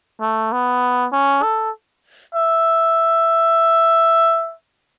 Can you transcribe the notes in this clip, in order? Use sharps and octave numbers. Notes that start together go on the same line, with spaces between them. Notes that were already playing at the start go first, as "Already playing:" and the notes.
A3
B3
C#4
A4
E5